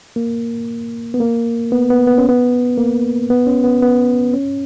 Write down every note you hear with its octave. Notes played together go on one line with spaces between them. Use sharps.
A#3
B3
A#3
B3
B3
B3
C#4
B3
A#3
B3
C#4
B3
B3
C#4